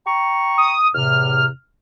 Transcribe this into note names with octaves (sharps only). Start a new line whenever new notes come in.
G5 A#5 C#6
D#6
E2 A2 C3 F6